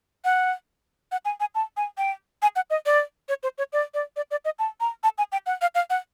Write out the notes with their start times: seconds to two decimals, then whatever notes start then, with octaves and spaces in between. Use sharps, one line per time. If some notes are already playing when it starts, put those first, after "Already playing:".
0.25 F#5
1.12 F#5
1.25 G#5
1.40 G#5
1.55 A5
1.77 G#5
1.98 G5
2.42 G#5
2.56 F#5
2.70 D#5
2.86 D5
3.29 C#5
3.43 C5
3.58 C#5
3.73 D5
3.94 D5
4.16 D5
4.31 D5
4.45 D#5
4.59 A5
4.81 A#5
5.04 A5
5.18 G#5
5.32 G5
5.46 F#5
5.62 F5
5.75 F5
5.90 F#5